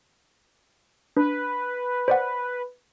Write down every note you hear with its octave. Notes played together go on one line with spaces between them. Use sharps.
D4 B4
C5 D5 F#5